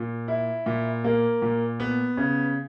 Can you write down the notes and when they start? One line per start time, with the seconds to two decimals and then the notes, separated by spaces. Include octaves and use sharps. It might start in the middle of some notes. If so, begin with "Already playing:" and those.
Already playing: A#2
0.28 E4
0.66 A#2
1.04 A#3
1.42 A#2
1.80 B3
2.17 C#3